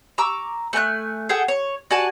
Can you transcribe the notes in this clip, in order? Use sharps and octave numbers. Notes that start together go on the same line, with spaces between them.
A#5 C#6 D6 E6
A3 G#5 A5 F#6
G#4 A4 F#5 G5
C#5
F#4 D5 G#5 A5